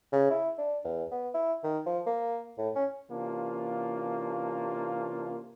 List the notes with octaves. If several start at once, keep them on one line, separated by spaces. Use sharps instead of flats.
C#3
E4
D4
E2
B3
E4
D#3
F3
A#3
A2
C#4
C3 E3 A#3 C#4 D4 F4